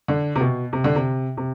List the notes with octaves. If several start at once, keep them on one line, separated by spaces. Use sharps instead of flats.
D3
C3
B2
C3
D3
C3
C3